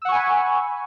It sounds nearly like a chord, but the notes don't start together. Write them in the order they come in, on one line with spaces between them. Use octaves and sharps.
E6 F#5 C#6 G#5 B5